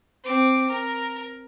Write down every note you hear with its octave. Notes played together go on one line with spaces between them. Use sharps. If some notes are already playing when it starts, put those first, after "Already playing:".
C4 D6
A#4